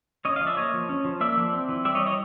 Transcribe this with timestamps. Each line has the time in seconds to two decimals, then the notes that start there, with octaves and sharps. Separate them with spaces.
0.25 C#4 C#5 D#5
0.36 D#5 F5
0.41 F3
0.47 D5 E5
0.57 A#3 C#5 D#5
0.74 F3
0.89 C#4
1.05 F3
1.21 A#3 D5 E5
1.37 F3
1.53 C4
1.69 E3
1.85 G3 D5 E5
1.95 C#5 D#5
2.01 E3
2.06 C#5 D#5